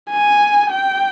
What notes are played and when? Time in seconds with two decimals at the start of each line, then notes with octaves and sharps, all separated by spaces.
0.11 G#5
0.70 G5